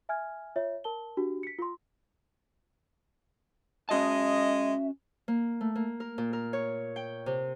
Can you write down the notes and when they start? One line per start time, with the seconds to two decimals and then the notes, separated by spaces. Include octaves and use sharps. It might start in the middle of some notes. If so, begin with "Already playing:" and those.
0.09 E5 G#5 F6 G#6
0.56 F4 C#5 E5
0.84 A#4 A5 G7
1.17 D4 F#4 G4
1.43 B6 C#7
1.59 F4 C6
3.89 G#3 C#4 F#4 D#5 E5 A5
5.28 A#3
5.61 A3
5.75 A#3
6.00 A#4
6.18 A#2
6.33 A#4
6.53 C#5
6.96 G5
7.26 C3